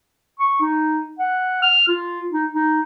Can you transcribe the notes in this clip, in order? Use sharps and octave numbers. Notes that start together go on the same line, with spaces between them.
C#6
D#4
F#5
F6
F4
D#4
D#4